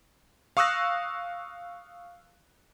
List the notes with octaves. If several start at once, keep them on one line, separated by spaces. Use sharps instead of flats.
F5 C#6 D#6 E6 F#6 A#6